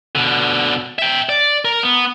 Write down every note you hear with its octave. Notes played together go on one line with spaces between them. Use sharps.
B2 D3
E5 G5
D5
A#4
B3